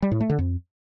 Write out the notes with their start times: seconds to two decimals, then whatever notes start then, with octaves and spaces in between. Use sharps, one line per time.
0.02 G3
0.11 A2
0.20 A3
0.30 D3
0.39 F2